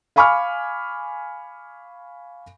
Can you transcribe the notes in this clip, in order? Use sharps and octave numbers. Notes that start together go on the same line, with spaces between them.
F5 G#5 B5 C#6 D6 F6